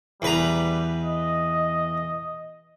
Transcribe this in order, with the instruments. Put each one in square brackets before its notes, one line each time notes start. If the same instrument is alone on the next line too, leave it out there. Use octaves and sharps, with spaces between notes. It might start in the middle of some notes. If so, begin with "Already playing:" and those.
[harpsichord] E2 B4 A#5 [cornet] G3
[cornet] D#5